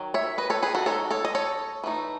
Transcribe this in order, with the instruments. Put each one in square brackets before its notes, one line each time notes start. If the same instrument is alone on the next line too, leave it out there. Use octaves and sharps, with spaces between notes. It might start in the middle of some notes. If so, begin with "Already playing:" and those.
Already playing: [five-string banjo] D#3 F#3
C#5 E5
B4 D#5
A4 C#5
G#4 B4
F#4 A4
G#3 D#4 A4 C#5
A4 C#5
D#5
A4 C#5
E3 A3 D#4